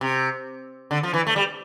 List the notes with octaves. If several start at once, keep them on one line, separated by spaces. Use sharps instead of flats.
C3
D3
F3
E3
A3
G3